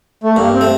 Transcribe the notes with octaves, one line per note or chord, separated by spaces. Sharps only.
A3
G2 A#3
C4
A3